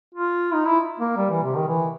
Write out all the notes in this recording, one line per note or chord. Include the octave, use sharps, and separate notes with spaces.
F4
D#4
E4
A#3
G3
E3
C3
D#3
E3